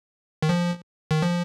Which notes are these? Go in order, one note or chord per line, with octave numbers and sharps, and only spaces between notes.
D#3
F3
D#3
F3